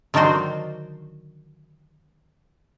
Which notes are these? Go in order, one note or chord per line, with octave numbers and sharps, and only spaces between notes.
D3 D#3 F#3 D4 F#4 C5